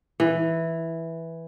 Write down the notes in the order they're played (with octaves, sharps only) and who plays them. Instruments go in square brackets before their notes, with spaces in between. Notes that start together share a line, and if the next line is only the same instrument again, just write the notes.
[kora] E3